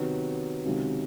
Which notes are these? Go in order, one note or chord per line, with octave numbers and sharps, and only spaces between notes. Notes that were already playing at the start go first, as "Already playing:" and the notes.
Already playing: C3 D#3 F#3 B3
C#2 C3 D#3 F#3